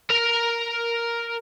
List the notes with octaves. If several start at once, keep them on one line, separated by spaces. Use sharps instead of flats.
A#4 A#5